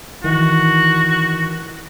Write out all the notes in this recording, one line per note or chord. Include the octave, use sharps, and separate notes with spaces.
D#3 E3 F#4